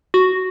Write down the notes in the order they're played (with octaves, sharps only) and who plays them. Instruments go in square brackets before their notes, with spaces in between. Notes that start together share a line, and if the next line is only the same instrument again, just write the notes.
[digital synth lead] F#4